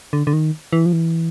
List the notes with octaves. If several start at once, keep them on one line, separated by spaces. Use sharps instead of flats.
D3
D3
D#3
E3
F3
E3